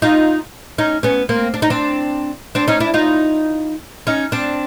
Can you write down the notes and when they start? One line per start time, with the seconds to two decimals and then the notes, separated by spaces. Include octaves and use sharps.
0.02 D#4 F4
0.78 C#4 D#4
1.03 B3 C#4
1.29 A#3 C4
1.54 D4
1.62 D#4
1.70 C4 D4
2.55 C4 D4
2.68 C#4 D#4
2.80 D4 E4
2.94 D#4 F4
4.07 C#4 D#4
4.32 C4 D4